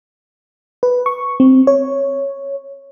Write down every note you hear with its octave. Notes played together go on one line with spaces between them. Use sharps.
B4
C#6
C4
C#5